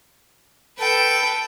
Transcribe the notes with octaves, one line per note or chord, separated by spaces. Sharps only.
A4 B4 G5